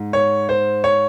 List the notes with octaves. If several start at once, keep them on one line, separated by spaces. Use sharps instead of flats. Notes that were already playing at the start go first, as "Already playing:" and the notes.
Already playing: G#2
C#5
C5
C#5